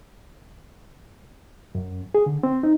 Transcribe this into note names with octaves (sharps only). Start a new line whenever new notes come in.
F#2
G#4
D3
C4
D#4